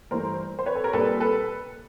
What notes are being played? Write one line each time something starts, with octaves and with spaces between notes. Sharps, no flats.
G2 E3 A3 A#4 C5
C5
B4 C#5
A4
A#4
A#2 G3 A#3 D4 A4 B4
A4 B4